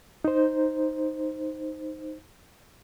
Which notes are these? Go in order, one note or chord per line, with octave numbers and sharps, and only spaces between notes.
D#4 C5